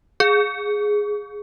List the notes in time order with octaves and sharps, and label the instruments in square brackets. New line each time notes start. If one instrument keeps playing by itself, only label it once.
[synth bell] G#4